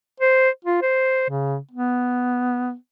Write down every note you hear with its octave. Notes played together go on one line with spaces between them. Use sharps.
C5
F4
C5
C#3
B3